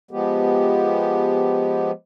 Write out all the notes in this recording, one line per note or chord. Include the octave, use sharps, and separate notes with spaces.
F3 G#3 B3 G4